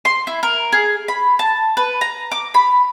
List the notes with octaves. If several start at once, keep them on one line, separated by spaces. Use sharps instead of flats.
C6
E4
A#4
G#4
B5
A5
B4
A#5
D6
B5